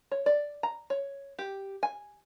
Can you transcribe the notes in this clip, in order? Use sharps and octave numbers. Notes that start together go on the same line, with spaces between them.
C#5
D5
A#5
C#5
G4
G#5